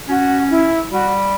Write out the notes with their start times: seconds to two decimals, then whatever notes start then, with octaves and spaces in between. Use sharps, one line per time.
0.08 C#4 F#4
0.50 E4
0.91 G3 F#4